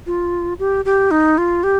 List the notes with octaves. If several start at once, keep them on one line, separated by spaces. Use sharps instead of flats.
F4
G4
G4
D#4
F4
G4